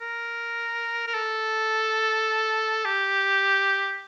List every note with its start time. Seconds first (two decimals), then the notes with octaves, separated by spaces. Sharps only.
0.01 A#4
1.07 A#4
1.14 A4
2.85 G4